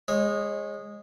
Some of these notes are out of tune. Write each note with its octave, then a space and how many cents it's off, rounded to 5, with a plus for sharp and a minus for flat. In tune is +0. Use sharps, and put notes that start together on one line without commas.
G#3 -10 C#5 -30